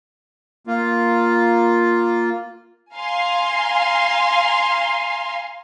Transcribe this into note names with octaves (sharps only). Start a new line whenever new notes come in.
A#3 F4
F5 G#5 A#5 C6